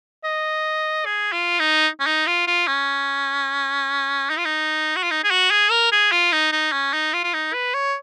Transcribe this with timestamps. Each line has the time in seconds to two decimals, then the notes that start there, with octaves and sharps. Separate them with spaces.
0.25 D#5
1.06 G#4
1.33 F4
1.60 D#4
2.00 C#4
2.07 D#4
2.27 F4
2.47 F4
2.68 C#4
4.30 D#4
4.37 F4
4.45 D#4
4.96 F#4
5.03 F4
5.11 D#4
5.24 G#4
5.31 F#4
5.51 G#4
5.71 A#4
5.92 G#4
6.12 F4
6.32 D#4
6.52 D#4
6.73 C#4
6.93 D#4
7.14 F4
7.24 F4
7.34 D#4
7.54 B4
7.74 C#5